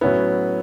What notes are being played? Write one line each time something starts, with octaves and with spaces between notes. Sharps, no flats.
A2 F#3 B3 C#4 E4